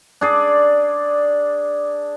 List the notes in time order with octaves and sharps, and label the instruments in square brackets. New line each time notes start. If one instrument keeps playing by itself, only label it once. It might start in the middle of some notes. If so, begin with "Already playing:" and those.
[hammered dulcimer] D4 G#4 D5